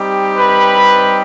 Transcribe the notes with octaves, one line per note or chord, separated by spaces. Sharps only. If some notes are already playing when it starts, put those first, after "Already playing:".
Already playing: G3 C4 D#4 G4
B4 B5